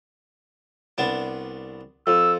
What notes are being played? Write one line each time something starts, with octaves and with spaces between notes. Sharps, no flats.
C2 B3 D4
F2 E6